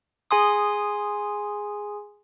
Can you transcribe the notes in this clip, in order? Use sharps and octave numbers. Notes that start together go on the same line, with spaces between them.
G#4 G#5 C6 D#6